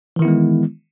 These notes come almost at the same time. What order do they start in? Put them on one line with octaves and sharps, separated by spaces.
E3 D#3 E4 B3 G#3